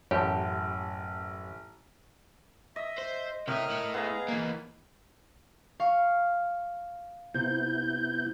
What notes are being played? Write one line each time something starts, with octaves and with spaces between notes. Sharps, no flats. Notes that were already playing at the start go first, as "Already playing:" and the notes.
A1 F#2 G4 C#5 A5
D#5 E5
C5
A2 C3 A#4 D#5 E5 F6
A3 E4
B3 G#4 D#5 F5 A#5
E3 A#3
F5 C#6 F6
C3 B3 E4 G6